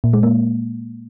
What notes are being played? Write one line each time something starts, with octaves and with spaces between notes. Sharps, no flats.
A#2
G#3
A#3